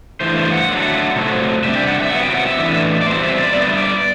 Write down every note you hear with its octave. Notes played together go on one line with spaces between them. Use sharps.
G2 E3 A3 C5
C5
F#5
D3 F#3 A3
C3 F#3 A3 C4
C3 G3 D4 E5
G5
F#5
E5
C3 F#3 B3 F#5
G5
F#5
E5
A2 E3 A3 D4
D5
E2 B2 G3 C4 C5
E5
D5
D3 G3 B3 E5
D5